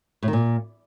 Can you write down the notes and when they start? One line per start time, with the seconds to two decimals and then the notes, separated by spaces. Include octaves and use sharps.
0.23 A2
0.28 D#3
0.33 A#2